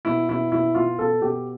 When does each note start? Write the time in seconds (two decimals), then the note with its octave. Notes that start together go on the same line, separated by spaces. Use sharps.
0.05 B2 E4
0.29 B2 E4
0.52 B2 E4
0.75 B2 F4
0.98 B2 A4
1.21 B2 G4